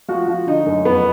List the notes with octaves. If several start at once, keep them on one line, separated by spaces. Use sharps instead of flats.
F3 F#4
F3
D3 D#4
F#2
F2 B3